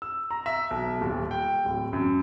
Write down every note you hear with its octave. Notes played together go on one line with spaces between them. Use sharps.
E6
A#5
E5
B1
D#1
G5
D1
F#2